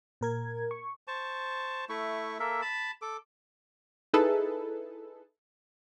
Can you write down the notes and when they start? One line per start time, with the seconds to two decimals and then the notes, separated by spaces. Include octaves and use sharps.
0.21 A#2 A#4 G#6
0.71 C#6
1.08 C5 A5 C#6
1.89 A3 E4 C#6
2.40 A#3 A4 A#4 E5
2.62 A5 B5
3.02 A4 D6
4.13 D#4 E4 G#4 A4 B4